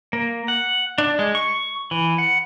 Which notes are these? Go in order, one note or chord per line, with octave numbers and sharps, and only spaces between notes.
A#3
F#5
D4
G#3
C#6
E3
F#5